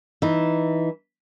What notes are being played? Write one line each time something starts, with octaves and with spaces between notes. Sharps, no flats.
E3 D#4